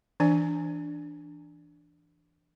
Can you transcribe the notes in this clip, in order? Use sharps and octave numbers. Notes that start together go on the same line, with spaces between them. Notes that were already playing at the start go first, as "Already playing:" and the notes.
E3 D4 D5 G#5